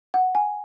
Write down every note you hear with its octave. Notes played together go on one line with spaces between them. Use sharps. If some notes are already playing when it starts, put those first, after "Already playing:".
F#5
G#5